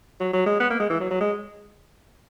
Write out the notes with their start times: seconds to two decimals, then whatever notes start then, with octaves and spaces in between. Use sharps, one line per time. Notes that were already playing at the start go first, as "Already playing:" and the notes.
0.20 F#3
0.33 F#3
0.46 G#3
0.60 B3
0.71 A#3
0.80 G#3
0.90 E3
1.00 F#3
1.11 F#3
1.21 G#3